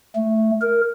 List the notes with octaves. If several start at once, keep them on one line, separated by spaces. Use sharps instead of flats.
A3
A#4